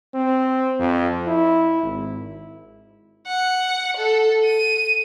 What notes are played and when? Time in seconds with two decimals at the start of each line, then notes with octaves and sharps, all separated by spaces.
0.14 C4
0.79 F2
1.27 E4
1.83 G#1
3.27 F#5
3.96 A4
4.44 D#7